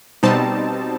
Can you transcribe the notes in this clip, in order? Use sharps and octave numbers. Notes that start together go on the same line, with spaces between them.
B2 G3 C4 D#4 A5